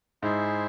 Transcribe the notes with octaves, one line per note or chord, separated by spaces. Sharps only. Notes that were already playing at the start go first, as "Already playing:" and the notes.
G#2 E4 G#4 C5 E5